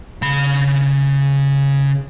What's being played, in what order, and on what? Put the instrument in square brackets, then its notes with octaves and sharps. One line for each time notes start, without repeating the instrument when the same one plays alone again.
[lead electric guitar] C#3 B5